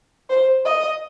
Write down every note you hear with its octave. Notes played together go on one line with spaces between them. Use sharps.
C5
D#5